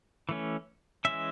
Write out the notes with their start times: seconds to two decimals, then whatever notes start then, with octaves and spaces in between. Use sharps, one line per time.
0.29 E3 A3 C#4
1.05 E3 G#3 C#4 E5